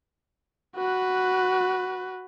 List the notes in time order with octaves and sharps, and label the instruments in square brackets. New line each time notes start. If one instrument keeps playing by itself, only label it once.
[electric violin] F#4 B4